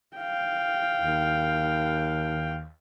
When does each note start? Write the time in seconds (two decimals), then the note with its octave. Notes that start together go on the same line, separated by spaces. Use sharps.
0.17 F5 G5
1.01 D#2